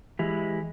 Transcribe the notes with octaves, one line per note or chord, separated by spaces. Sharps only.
E3 G#3 E4 G4